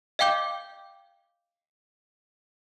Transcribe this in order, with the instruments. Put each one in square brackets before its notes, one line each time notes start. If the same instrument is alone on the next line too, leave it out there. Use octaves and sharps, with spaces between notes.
[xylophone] D#5 F5 G5 D6 G6